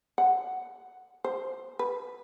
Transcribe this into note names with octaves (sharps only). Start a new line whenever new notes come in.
F#5
C5
B4